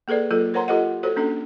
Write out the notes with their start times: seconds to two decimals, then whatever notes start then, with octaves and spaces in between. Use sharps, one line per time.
0.08 A#3 G#4 A4 B4 D5
0.31 F#3 A#3 F4 A4
0.54 A#4 C5 C#5 F#5 A#5 C6
0.68 F4 G4 A4 C5 D#5 F#5
1.03 F#4 A4 C5 C#5
1.16 A#3 C#4 D4 A4